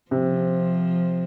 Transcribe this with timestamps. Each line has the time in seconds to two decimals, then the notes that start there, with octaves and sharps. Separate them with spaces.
0.11 C3 F3